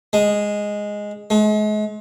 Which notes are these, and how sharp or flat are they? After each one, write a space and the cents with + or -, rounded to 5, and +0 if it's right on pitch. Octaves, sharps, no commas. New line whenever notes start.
G#3 -5
G#3 +40